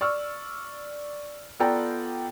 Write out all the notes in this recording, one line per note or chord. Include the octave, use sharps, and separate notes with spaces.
D5 C#6 E6 F6
B3 F4 A4 D5 G5 A#5